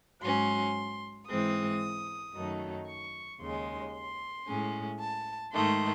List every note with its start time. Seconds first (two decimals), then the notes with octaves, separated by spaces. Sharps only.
0.23 G#2 F#3 C#4 C6
1.29 G#2 E3 G#3 C4 D#6
2.34 F#2 D#3 F#3 A3 D#4
2.88 C#6
3.40 D#2 C#3 G#3 C6
3.93 C6
4.46 A2 G#3 C#4
4.99 A5
5.52 G#2 D#3 A3 C6